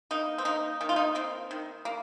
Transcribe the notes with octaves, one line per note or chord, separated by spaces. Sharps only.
A#3 D#4
C4
A#3 D#4
D#3 D#4
F4
D#4
A#3 C4
D#3
A#3